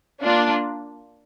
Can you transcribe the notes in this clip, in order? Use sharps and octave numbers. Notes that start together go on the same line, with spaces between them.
A#3 D4 F4